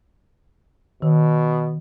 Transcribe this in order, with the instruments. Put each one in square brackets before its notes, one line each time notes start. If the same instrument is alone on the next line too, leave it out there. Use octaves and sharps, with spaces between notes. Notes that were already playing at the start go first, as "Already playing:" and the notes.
[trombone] B2 [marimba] D#3